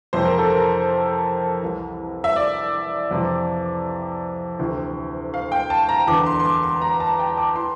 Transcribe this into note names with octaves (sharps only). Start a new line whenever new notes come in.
F2 C3 E3 C5
A#4
A4
A#4
C2 C3 E3
E5
D5
F2 C3 E3
D2 C3 E3
F5
G5
A5
A#5
E2 D3 D6
C6
C6
D6
C6
A#5
A5
G5
D6
E3 C6